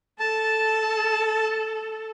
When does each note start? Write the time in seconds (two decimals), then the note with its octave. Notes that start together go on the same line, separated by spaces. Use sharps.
0.19 A4 A5